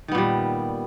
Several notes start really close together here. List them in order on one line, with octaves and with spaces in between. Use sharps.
D#3 B3 A#2 G3